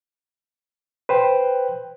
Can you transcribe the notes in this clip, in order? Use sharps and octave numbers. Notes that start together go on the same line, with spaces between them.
B4 C5 G5